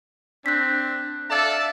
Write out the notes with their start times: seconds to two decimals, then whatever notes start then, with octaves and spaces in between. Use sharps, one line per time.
0.46 C4 D4 F#6 B6
1.31 A4 D5 E5 F5 A5